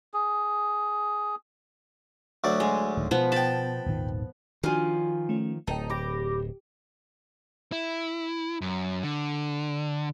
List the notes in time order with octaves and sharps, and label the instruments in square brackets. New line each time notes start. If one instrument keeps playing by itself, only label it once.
[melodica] G#4
[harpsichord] D2 F#3 D5
[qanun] G#3
[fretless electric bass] D1 D#3
[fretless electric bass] B2 [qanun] F3 B3
[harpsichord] G5 B5 [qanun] A5
[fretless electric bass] D#1 G#1 D#3
[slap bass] D#3 F3 [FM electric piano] D4 F#4 [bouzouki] F4 G#5
[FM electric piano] A3 C#4
[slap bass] D1 [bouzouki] D#4 [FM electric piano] G5 A5
[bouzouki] G4 [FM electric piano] B5 D6 A#6
[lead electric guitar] E4
F#2
D3